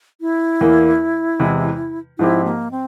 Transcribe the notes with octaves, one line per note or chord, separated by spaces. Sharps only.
E4
E2 E3 A#3
E2 C3 E3 G#3
G#2 F3 C4 E4 G4
A#3
C4